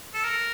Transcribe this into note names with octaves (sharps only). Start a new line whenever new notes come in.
A4
A#4